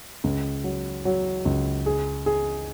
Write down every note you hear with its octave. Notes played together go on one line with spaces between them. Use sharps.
C#2
F#3
F#3
C#2
G#4
G#4